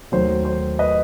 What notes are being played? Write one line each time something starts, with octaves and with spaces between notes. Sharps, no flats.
D#2 D#3 F#3 A3 C5
C5
B4 D#5